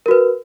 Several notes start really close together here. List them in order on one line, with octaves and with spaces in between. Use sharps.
A#4 F#4 B4